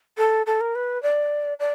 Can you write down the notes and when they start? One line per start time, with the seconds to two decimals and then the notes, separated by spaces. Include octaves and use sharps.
0.18 A4
0.46 A4
0.61 A#4
0.75 B4
1.03 D5
1.60 D5